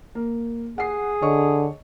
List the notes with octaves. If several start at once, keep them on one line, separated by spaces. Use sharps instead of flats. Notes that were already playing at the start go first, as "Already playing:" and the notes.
A#3
G#4 F#5 C7
D3 C#5 D#5 C#6